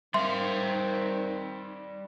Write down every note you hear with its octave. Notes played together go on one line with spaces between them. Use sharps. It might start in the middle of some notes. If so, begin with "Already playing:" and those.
D#3 G3 C4 E5 F5 C6